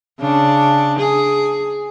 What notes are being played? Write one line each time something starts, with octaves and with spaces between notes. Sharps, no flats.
C#3 D4
G#4